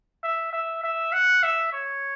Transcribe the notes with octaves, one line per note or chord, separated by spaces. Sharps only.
E5
E5
E5
F#5
E5
C#5